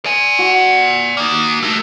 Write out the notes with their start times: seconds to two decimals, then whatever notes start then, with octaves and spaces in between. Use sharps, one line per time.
0.05 D5 G#5
0.39 F#4
1.17 A#3 D#4
1.63 A3 A#4